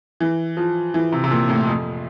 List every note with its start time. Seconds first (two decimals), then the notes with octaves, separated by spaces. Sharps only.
0.20 E3
0.57 F3
0.94 E3
1.12 C3
1.24 C3
1.31 A#2
1.49 A2
1.67 F2